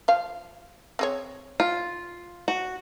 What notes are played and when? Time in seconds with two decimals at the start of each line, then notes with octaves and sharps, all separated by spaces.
0.08 F3 F5
0.99 C4 G#4 C#5
1.60 F4
2.48 F#4